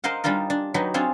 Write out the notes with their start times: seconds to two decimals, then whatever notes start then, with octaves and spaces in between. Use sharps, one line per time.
0.04 A#4 C5 D#5 F5 F#5
0.24 G3 D4 D#4 F4 A#4
0.50 D4
0.74 F#3 D4 D#4 G4 B4
0.94 C4 D4 F4 G#4 C#5